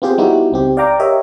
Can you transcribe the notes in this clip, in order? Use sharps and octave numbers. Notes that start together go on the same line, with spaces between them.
B3 C4 F4 G4 G#4 C5
G3 B3 D#4 E4 F#4 G4
C#2 C4 G4
D5 F5 G5 A#5 D6
G4 A#4 C#5 D#5 E5